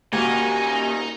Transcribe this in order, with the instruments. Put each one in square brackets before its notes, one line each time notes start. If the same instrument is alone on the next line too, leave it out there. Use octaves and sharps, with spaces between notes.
[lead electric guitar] A#2 G4 [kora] A#3 F#4 [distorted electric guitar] D#4 [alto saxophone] G#5